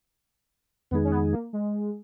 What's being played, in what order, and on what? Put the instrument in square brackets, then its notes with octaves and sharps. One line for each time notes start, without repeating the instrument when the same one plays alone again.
[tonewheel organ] F2 D#3 G#3 D#4 G#4 [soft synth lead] B3
[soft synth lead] C#4
B3
A#3
G#3